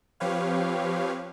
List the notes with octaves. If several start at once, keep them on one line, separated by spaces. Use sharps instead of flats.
F3 C4 G4 B4 C#5 F5